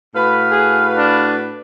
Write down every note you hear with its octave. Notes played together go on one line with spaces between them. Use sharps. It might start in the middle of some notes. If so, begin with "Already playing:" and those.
A2 F#4 B4 F5
G#4
D4